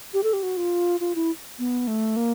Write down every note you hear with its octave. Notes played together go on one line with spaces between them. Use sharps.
G4
A4
G4
F#4
F4
F4
E4
B3
A3
A#3